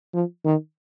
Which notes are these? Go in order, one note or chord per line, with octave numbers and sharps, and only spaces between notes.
F3
D#3